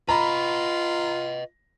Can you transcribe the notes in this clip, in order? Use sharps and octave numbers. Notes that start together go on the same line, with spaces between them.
F4 B4 D#5 A#5 B5